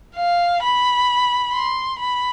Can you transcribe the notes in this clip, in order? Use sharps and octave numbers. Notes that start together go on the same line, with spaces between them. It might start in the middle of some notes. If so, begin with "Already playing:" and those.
F5
B5
C6
B5